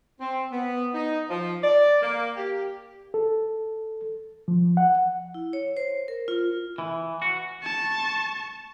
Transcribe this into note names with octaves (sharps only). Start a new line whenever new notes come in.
C4
B3
D#4
F3
D5
A#3
G4
A4
F3
F#5
E4
C#5
C5
A#4
F4
E3
F#4
A5 C#6